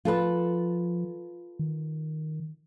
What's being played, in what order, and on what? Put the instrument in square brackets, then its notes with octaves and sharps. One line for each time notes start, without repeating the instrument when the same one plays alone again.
[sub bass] F3 [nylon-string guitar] F4 A4 B4
[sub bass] D#3